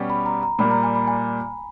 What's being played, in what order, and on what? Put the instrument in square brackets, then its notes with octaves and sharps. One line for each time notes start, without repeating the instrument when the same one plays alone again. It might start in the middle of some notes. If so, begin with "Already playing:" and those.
Already playing: [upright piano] B2 G3 C#4 G4
[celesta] B5
A#5
A#5
[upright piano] A#2 G3 A#3 [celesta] B5
[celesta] A#5
G#5
B5
G#5